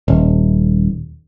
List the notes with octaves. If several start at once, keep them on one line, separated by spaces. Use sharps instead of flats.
D#1